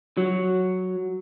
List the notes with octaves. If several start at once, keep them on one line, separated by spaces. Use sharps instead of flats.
F#3